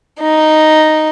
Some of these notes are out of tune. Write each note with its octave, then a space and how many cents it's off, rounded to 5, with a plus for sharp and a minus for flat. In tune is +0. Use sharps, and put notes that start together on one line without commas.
D#4 -5